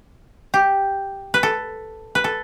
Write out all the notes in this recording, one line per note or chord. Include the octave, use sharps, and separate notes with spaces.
G4
B4
A4
B4
A4